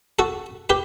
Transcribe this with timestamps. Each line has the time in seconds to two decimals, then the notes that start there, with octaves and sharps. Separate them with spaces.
0.19 F#4 A4
0.70 G4 B4